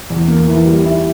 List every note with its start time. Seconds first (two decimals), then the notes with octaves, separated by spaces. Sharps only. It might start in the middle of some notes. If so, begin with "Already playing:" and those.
0.10 E2
0.28 A#3
0.48 E3
0.65 G3
0.85 E4